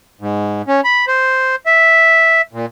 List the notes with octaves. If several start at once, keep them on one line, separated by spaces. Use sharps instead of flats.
G#2
C#4
B5
C5
E5
A#2